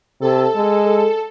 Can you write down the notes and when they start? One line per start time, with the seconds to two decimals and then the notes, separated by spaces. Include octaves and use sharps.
0.21 C3 A4
0.56 G#3